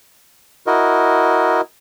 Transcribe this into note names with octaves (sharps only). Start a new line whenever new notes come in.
E4 F#4 A#4 D#5